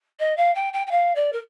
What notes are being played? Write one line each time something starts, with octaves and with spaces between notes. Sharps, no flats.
D#5
F5
G5
G5
G5
F5
D5
A#4